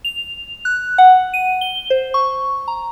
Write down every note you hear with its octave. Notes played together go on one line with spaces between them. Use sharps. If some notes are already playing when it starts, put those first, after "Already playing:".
F7
F#6
F#5
D#7
G7
C5
C#6
A#5